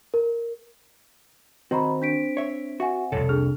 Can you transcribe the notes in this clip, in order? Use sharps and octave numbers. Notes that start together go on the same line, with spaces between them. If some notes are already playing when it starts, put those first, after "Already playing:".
A#4
D#3 C4 F#4 C5 D#5 A#5 B5
D4 B6 D7
C#5 E5
F#4 E5 F#5 G#5
C2 F2 C3 A4 C#5
D4 G#4 F6